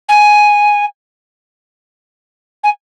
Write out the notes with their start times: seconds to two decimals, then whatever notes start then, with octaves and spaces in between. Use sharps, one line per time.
0.09 G#5
2.64 G#5